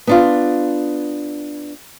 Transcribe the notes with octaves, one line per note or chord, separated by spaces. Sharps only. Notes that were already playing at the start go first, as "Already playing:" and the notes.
B3 D4 F4